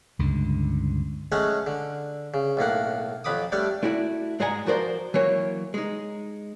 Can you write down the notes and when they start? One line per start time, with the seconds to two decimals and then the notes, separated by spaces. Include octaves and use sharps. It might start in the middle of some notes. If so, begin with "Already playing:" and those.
0.19 C#2 G2 D3
1.32 F#3 G#3 A3 C#4 C#5 F#5
1.67 D3
2.34 C#3
2.57 B1 A2 A#3 F#5
3.24 F2 F#3 B5 D6 D#6
3.52 G3 A3 D4 C#5
3.83 A3 E4 F#4 D5
4.40 G#2 G#3 D5 F#5 G#5 A#5
4.66 F3 F#4 A#4 C5 D5
5.14 E3 F#3 A#3 C#5
5.74 G#3 D#4